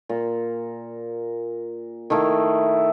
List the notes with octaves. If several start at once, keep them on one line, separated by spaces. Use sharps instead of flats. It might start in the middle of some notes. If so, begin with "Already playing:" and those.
A#2
D#3 A3 E4 F5